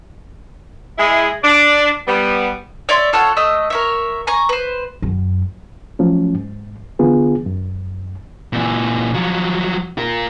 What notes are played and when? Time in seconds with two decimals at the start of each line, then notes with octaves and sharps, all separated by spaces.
0.99 G#3 E4 G#4
1.43 D4 D5
2.08 G3 B3
2.89 C#5 D5 E5 C6
3.13 F4 A4 C#5 F#5
3.37 A3 D#5 E6
3.70 A#4 C#5 E5
4.27 G#5 A#5 C#6
4.49 B4 C5
5.02 F#2
5.99 F3 F#3 A3 C#4
6.34 G#2
6.99 D3 E3 B3 F4 G#4
7.46 F#2
8.53 A#2 E3
9.14 F3 F#3
9.98 F4 A#4